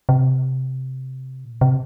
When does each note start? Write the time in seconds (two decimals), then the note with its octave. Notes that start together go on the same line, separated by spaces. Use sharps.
0.09 C3
1.45 A#2
1.61 C3